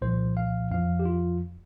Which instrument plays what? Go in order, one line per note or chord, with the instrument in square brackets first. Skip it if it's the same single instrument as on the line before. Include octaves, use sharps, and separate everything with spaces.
[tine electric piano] C2 A#2 F3 C5
F5
F2 F3 F5
G4
F4